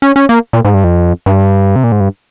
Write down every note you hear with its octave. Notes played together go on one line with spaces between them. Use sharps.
C#4
C#4
A#3
A#2
G#2
G2
F2
G2
C3
A#2
G#2
G2